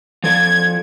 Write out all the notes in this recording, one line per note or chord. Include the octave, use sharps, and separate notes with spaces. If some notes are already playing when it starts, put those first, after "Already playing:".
F3 A4 D5 G#6